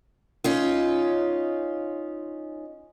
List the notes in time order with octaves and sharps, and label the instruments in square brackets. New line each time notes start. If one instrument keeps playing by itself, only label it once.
[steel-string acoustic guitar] C#4 D#4 F4